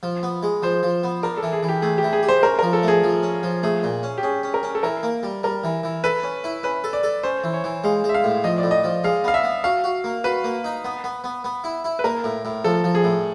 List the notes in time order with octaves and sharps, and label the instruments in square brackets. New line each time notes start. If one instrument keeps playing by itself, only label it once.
[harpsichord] F3
B3
G#3
[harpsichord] F3 [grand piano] C5
[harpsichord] F3
B3
[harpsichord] D4 [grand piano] A#4
[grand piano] A4
[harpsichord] E3
[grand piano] G#4
[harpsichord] E3
[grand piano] G4
[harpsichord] A3 [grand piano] G#4
[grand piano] G4
[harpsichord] E3
[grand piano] G#4
[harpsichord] G4
[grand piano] C5
[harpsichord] C#4 [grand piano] A#4
[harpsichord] F3 [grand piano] A#4
[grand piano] A4
[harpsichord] A3 [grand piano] G#4
[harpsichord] F3
C#4
F3
[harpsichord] A3 [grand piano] G#4
[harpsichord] A#2
C#4
[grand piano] G4
[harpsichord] C#4 [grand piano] G#4
[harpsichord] C#4
[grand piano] A#4
[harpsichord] C#4
[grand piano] A4
[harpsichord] E3 [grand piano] A#4
[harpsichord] A#3
G3
[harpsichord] G3 [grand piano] A#4
[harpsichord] E3
E3
[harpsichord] A4 [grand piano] B4
[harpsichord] C#4
E4
[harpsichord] C#4 [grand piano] B4
[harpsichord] A4
[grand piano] D5
[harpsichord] A4
[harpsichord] C#4 [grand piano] C5
[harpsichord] E3
[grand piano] C#5
[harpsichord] E3
[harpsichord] G#3 [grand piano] F5
[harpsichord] G#3
[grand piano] E5
F5
[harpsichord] A2
[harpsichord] F3 [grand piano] D#5
[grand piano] D5
[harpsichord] A2
[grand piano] D#5
[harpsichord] F3
[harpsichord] G#3 [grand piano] F5
[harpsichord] B3 [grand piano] F5
[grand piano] E5
[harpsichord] B3
[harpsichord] F#4 [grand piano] F5
[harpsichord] F#4
A#3
[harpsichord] F#4 [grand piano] B4
[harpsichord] A#3
D#4
B3
B3
B3
B3
E4
E4
[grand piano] B4
[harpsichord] A#3 [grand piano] A#4
[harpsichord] A2
A2
[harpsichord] F3 [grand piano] A4
[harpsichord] F3
[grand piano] G#4
[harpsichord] A2